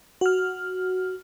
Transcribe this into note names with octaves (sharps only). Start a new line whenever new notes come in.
F#4 F6